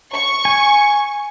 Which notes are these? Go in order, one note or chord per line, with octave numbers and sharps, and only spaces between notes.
C#6
G#5